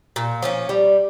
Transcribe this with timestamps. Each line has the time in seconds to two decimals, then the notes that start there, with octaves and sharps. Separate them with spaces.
0.16 A#2
0.42 F3 A#3 C#4
0.69 G3